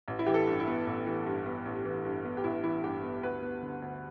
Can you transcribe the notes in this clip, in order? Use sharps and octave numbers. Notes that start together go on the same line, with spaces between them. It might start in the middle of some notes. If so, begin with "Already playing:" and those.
A1
E4
E3 G4
A4
G2
E4
B3
A1
E3
G2
B3
A1
E3
G2
B3
G4
A1 E4
E3 E4
G2 G4
B3
D2 B4
B3
D3
D2